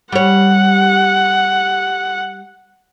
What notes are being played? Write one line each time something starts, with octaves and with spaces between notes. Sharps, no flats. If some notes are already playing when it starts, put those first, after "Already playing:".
G3 C#5 F#5